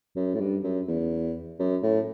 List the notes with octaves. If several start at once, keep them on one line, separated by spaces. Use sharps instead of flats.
F#2
A2
G2
F#2
E2
F#2
A2